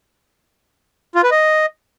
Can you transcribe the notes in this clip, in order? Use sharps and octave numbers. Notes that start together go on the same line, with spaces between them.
F4
B4
D#5